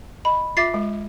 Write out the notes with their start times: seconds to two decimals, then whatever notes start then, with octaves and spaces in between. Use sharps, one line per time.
0.25 D#5 B5
0.57 F4 E5 D6 A6 C7
0.74 G#3